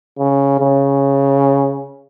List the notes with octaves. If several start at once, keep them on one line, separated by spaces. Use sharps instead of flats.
C#3
C#3